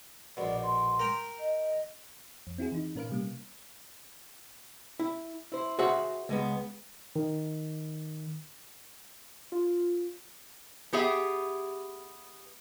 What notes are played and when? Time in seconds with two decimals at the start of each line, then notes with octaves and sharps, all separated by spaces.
0.37 A#1 B2 D5
0.63 C6
0.99 A#4 G5 A#5
1.39 D#5
2.47 F2
2.58 C4 E4 F#4 G#4
2.72 E3 D#4
2.96 A#2 C#4 A#4 B4 F5 D7
3.10 C3 G3 A#3
4.99 E4
5.52 E4 C5
5.79 F#4 G#4 C5 E5 F#5
6.29 C#2 G#3 B3
7.16 D#3
9.52 F4
10.93 B3 G4 G#4 E5